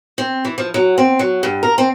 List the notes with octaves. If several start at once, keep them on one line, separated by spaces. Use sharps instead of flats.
C4
E3
F3
F#3
C4
F#3
G2
A#4
C4